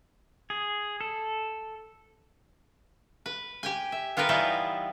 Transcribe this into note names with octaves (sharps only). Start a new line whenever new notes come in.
G#4
A4
B4
G4 G5 G#5
E5
B3 F4 G4 A#4 B4
E3 G3 B3 D#4 F4 E5